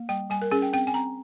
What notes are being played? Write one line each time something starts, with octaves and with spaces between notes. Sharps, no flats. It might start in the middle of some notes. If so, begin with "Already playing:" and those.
Already playing: A#3
G3 G5
G3 G#5
A#4
C#4 G#4
G5
C4 G5
G#5
C4 A#5